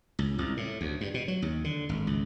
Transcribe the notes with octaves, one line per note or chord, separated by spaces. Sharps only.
C#2
C2
A2
D2
G2
B2
F#3
D#2
D3
G#1
C#2